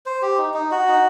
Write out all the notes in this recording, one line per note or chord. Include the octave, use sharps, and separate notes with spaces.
C5
G4
D#4
D#4
F#4
D#4